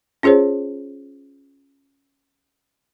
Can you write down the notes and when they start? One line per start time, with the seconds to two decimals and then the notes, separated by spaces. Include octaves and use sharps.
0.23 C#4 F4 G#4 C5 C#5